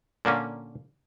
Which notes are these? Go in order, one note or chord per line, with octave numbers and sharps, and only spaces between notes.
A#2 D3 A#3 C#4